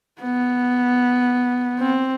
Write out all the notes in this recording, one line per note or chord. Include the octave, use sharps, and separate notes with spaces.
B3
C4